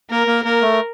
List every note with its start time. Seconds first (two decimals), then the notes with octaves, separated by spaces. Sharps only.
0.10 A#3 A#4
0.27 A#3
0.45 A#3 A#4
0.62 A3